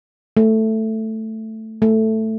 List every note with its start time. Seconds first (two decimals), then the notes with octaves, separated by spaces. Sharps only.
0.37 A3
1.82 A3